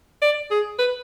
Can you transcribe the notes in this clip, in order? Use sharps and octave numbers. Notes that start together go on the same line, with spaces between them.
D5
G#4
B4